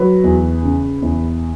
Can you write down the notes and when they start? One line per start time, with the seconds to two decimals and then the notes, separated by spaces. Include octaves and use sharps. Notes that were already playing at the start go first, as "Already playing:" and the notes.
Already playing: F#3 B4
0.24 E2
0.63 C#3
1.02 E2